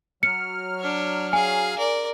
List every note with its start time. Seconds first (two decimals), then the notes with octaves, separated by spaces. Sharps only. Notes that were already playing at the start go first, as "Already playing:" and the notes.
0.23 F#3 F6 C#7
0.80 D4 C#5
1.33 G#4 F5 G#5
1.78 A#4 D5